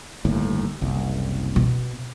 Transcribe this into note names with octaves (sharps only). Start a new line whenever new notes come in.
G1 D#2 A2
F#1 C2
B2